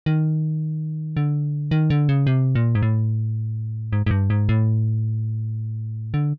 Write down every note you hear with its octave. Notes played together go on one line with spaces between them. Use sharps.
D#3
D3
D#3
D3
C#3
C3
A#2
G#2
A2
G#2
G#2
G2
G#2
A2
D3